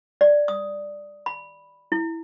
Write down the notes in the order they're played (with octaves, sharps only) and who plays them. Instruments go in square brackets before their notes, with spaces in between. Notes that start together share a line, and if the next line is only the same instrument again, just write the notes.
[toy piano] D5
D#6
B5
E4